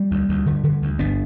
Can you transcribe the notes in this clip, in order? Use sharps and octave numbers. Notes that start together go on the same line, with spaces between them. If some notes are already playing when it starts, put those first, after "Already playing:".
Already playing: G3
D2
D2
D3
D3
D2
G1 B3 D4